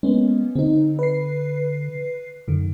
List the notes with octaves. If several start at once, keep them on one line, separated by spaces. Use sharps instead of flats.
G#3 A#3 B3 C#4
D3 C4 D#4
B4 C7
F#2 D3 D#3